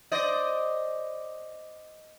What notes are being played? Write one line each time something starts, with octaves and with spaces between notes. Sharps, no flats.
C5 D5 D#5